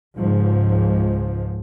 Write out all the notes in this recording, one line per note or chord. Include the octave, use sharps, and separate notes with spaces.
C#2 G#2 F3